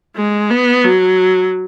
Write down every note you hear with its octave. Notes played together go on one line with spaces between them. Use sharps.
G#3
B3
F#3